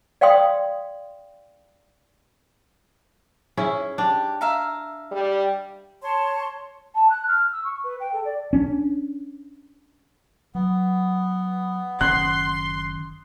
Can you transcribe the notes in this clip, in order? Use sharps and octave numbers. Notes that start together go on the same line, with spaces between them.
D5 F5 G5 C6 D#6
C#4 E4 G#4
D4 G4
E5 F5 A#5
G3
C#5 A5 C6
A5
F#6
F6
E6
C#6
B4
G5
A4
D5
C#4 D4
F#3 B3
F#1 D#3 C#4 C6 F#6